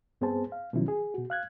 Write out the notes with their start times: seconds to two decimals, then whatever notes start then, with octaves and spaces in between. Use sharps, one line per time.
0.21 G2 B3 C4 G#4 C5 A5
0.52 F5
0.73 B2 D#3 F3 F#3 C#4 E4
0.88 G#4
1.14 B2 F#4
1.30 F5 F#6 G#6